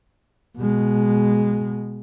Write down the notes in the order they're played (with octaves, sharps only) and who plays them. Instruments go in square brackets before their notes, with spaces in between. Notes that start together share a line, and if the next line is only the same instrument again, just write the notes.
[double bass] B2 G#3